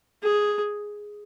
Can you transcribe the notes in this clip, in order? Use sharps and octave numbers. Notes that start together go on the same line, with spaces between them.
G#4